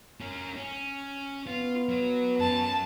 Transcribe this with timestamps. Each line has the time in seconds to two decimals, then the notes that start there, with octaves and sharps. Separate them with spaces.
0.20 C#4 A#4
0.56 C#4
1.47 B3 F4
1.89 F#3
2.40 F#2 A5